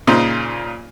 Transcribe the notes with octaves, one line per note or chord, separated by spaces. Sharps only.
A#2 C#3 D#4 C5